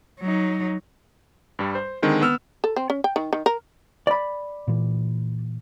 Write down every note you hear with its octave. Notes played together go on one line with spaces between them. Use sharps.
F#3 D#4
G2 G3
C5
D3 D#3 G#3 C4
B3 E6 F6
A4
C4
C#4
G5
D#3
D#3
A#4
D5 B5
A#2 E3